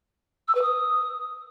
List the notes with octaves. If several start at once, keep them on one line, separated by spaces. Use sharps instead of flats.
E6
B4
D#6